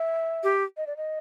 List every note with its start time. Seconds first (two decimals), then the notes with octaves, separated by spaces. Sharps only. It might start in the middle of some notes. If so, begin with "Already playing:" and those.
Already playing: E5
0.43 G4
0.77 D#5
0.87 D5
0.97 D#5